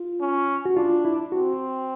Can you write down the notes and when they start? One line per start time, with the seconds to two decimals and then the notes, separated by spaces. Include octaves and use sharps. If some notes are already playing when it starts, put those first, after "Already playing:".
Already playing: F4
0.21 C#4
0.65 F#4
0.76 D4 F4
1.05 E4
1.32 C4 F#4